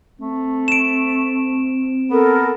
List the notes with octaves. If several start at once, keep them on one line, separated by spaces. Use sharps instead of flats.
A3 C4
D7 E7
B3 A4 A#4